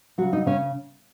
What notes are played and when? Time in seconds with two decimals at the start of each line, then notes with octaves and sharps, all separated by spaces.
0.18 F#3 F#4
0.21 C#3
0.33 D#4
0.46 C#3 C#4